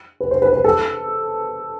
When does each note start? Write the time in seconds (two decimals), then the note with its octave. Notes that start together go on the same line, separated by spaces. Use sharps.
0.20 B4
0.31 C5
0.42 B4
0.53 B4
0.64 A4